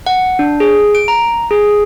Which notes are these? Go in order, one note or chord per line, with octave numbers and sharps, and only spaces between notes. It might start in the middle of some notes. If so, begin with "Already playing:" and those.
F#5
D4
G#4
D7
A#5
G#4